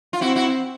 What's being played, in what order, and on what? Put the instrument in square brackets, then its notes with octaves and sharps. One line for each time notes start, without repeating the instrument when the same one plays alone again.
[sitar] F4
[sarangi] C4 [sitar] E4 F#4
[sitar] E4 F#4